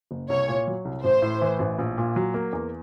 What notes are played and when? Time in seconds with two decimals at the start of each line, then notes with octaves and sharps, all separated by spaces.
0.11 F#1
0.29 C2 C#5
0.48 A#2
0.67 F#3
0.85 C2
1.04 A1 C5
1.22 A2
1.42 E3
1.59 A1
1.79 A#1
1.98 A#2
2.16 F#3
2.34 A#3
2.53 E2